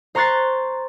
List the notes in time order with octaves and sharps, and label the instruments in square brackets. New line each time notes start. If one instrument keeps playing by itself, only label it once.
[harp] C5 A#5 C#6 F#6 A6 C7